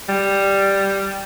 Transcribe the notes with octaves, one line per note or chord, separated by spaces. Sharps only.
G3